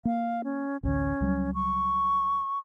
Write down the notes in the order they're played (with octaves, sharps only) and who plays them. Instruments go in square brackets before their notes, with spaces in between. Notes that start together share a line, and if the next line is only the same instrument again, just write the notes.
[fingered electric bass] A#3 [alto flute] F5
[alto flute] C#4
[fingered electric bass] A1 D2 D3 [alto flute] C#4
[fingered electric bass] C#2 F#3 G3
[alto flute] C#6